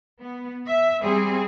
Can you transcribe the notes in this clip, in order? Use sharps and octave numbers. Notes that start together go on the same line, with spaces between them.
B3
E5
G3 C4 G#4